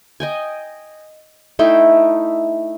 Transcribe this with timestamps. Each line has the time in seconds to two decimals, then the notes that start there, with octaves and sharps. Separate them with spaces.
0.20 D#5 G5 G#5
1.59 A3 D#4 E4 G5